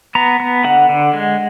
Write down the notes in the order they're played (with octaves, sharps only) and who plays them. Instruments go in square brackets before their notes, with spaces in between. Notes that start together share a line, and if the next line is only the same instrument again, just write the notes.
[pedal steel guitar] B3 A#5
B3
D3 F#5
D3
G#3